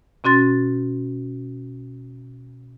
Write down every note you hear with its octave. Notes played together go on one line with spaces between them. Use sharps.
B2 C#4 F#4 C6 A6